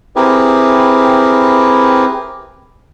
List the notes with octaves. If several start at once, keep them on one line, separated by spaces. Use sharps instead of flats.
C4 E4 G4 G#4 A#4 B4